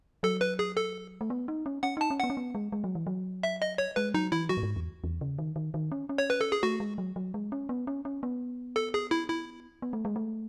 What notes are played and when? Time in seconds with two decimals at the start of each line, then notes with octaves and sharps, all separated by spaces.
0.23 F#3 A4
0.41 B4
0.59 G#4
0.77 A4
1.21 A3
1.30 B3
1.48 D#4
1.66 C#4
1.83 C#4 F#5
1.97 D#4 A5
2.10 C#4
2.20 B3 F#5
2.30 C#4
2.37 B3
2.55 G#3
2.72 G#3
2.84 F#3
2.95 E3
3.07 F#3
3.43 E5
3.62 D#5
3.78 C#5
3.96 G#3 B4
4.14 F#3 D#4
4.32 E3 E4
4.49 F#3 F#4
4.57 A2
4.63 G#2
4.76 E2
5.04 E2
5.21 C#3
5.39 D#3
5.56 D#3
5.74 D#3
5.92 C#4
6.09 C#4
6.18 C#5
6.30 B4
6.41 A4
6.52 G#4
6.63 A3 F#4
6.80 G#3
6.98 F#3
7.16 F#3
7.34 G#3
7.52 C#4
7.69 B3
7.87 C#4
8.05 C#4
8.23 B3
8.76 A4
8.94 G#4
9.11 E4
9.29 E4
9.82 B3
9.93 A3
10.05 G#3
10.16 A3